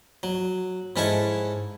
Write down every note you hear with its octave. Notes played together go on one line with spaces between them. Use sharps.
F#3
G#2 C#4 E4 A4 F#5 C#6